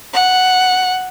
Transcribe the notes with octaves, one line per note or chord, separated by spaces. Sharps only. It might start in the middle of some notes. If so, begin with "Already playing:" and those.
F#5